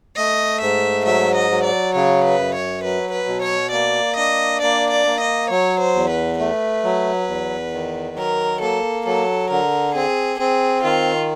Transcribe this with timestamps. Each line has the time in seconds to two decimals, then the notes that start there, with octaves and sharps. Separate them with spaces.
0.17 A3 D#5
0.61 G#2 E5
1.06 F#3 E5
1.36 D#5
1.50 F#3
1.65 D5
1.95 C#3 C#5
2.24 B4
2.39 F#2
2.54 C#5
2.84 F#3 B4
3.13 B4
3.28 B2
3.43 C#5
3.72 A#3 D5
4.17 D4 D#5
4.61 A#3 D5
4.91 D5
5.06 A#3
5.21 D#5
5.50 F#3 C#5
5.80 C5
5.95 E2
6.10 B4
6.40 A3 B4
6.84 F#3
7.28 E2
7.73 D#3
8.17 F#3 A#4
8.61 A#3 A4
9.06 F#3 A4
9.51 D3 A#4
9.95 C4 G#4
10.39 C4 G#4
10.84 D#3 F4